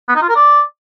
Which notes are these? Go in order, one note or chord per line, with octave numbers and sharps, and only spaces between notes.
B3
D#4
F4
A#4
D5